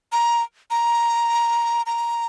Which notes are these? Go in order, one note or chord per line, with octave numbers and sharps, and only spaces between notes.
A#5
A#5
A#5